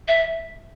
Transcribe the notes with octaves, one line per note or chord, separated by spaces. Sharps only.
E5